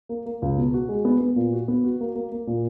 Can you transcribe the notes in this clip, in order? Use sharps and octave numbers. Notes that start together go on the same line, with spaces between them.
A#3
A#3
C#2
B2
F#4
G#3
B3
B3
A#2
F#4
B3
F#4
A#3
A#3
A#3
A#2